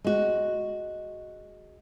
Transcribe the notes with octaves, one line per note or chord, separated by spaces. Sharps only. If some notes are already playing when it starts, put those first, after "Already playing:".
G#3 F#4